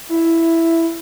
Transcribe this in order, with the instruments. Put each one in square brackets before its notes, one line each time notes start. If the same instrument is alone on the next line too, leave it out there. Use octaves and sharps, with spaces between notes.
[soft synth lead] E4